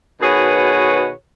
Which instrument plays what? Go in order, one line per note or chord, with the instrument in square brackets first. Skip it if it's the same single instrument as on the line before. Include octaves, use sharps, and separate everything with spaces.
[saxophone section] B2 D#3 F#4 G#4 B4 C#5